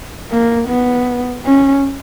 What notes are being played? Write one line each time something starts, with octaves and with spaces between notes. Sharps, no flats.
A#3
B3
C#4